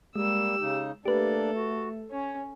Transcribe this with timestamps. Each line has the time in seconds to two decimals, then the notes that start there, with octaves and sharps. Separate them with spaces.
0.16 G3 G#3 A#3 G4 E6
0.61 C#3 D#4
1.06 A3 A#3 D4 G4 A4 B4 D5
1.55 F#4
2.11 C#4 C#5